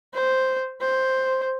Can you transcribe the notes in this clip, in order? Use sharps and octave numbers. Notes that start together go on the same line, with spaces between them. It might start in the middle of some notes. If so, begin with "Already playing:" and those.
C5
C5